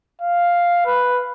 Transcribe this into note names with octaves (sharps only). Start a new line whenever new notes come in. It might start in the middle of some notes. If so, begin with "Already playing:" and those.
F5
B4